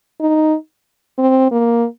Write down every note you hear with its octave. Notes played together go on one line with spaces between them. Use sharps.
D#4
C4
A#3